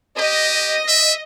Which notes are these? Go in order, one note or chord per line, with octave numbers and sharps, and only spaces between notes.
G4 D#5
E5